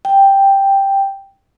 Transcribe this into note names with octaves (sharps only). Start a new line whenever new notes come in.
G5